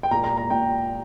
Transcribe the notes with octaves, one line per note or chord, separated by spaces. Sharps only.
G5
A#2 A#3 A#5
A#5
A#5
A#2 A#3 G5